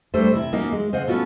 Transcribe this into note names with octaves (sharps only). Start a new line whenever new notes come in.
G3 A3 D4 C5
C3 E4
A#3 C#4 D#4 F#4
G#3
C#3 C5 D#5 F5 F#5
B3 C#4 D4 F4 F#4 A4